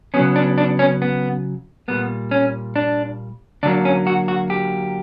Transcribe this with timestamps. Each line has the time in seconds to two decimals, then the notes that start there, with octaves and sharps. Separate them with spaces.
0.14 C#3 F#3 B3 C#4
0.36 D4
0.58 D4
0.79 C#4
1.02 B3
1.88 A#2 G3 A#3 B3
2.31 C#4
2.76 D4
3.63 D3 F#3 A#3 D4
3.85 C#4
4.07 F#4
4.28 F#4
4.50 G4